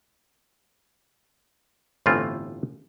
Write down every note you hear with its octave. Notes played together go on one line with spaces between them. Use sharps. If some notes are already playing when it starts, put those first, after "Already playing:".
G1 A2 E3 A3 C4 F4